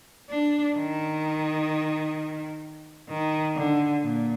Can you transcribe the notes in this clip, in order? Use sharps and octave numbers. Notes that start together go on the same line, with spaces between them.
D4
D#3
D#3
D3
A#2